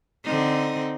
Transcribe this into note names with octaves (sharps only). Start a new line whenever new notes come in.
D3 C4 D#4